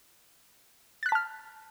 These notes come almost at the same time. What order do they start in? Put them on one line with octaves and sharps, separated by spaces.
A6 F#6 B6 A5 F6